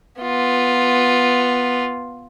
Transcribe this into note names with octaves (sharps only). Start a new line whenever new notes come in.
B3 F4